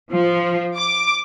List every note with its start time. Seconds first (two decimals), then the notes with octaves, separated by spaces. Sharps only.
0.12 F3
0.77 D6